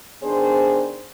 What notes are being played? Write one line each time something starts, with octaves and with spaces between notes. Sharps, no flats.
D#3 B3 D4 G#4 C5